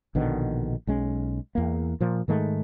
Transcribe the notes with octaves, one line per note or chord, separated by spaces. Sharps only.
A#1 B2 D3 D#3
B1 G#3 C#4
E2 A#3
A#2 F3
G#2 D#3 G#3 A3